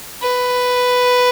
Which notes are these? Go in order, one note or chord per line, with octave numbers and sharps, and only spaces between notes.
B4